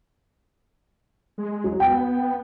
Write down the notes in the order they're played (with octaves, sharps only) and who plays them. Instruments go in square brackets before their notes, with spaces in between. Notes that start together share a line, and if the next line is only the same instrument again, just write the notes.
[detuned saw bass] G#3
[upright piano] F#3
[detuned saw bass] B3 [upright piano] G5